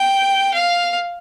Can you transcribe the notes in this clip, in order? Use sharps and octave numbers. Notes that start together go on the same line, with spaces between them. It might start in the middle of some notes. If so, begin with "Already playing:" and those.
Already playing: G5
F5